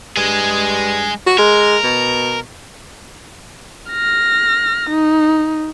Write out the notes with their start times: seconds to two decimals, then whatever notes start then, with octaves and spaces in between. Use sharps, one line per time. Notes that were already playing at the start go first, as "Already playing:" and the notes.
0.17 G2 G#3 G#4
1.26 F#4
1.38 G#3 A#4
1.84 B2
3.90 F6 A#6
4.90 D#4